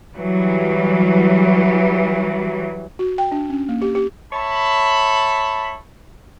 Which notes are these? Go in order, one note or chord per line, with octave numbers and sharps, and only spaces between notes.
E3 F#3 G3
F#4
G5
D4
C#4
A#3
G4
G4
C#5 E5 A5 B5